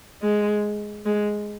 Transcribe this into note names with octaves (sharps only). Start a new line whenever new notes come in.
G#3
G#3